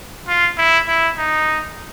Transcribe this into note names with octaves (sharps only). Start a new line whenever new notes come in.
F4
E4
E4
D#4